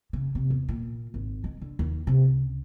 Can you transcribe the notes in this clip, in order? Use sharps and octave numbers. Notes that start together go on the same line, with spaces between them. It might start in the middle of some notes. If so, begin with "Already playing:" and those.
C#3
C3
E2
A#2
G#1
G#3
D3
D#2
C3
C#2